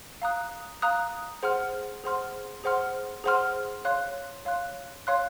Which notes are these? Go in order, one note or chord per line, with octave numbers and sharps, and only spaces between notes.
F5 A#5 D#6 F#6
F5 A#5 D#6 F#6
G#4 C5 F#5 C6 F6
G#4 C5 F#5 C6 F6
G#4 C5 F#5 C6 F6
G#4 C5 F#5 C6 F6
C#5 F5 C6 F#6
C#5 F5 C6 F#6
C#5 F5 C6 F#6